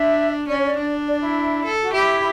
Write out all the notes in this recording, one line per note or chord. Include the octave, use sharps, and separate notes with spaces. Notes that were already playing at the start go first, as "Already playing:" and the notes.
Already playing: D4 E5
C#4 D5
C#5
D5
D4
D5
E4
A4
F#4
E4 G4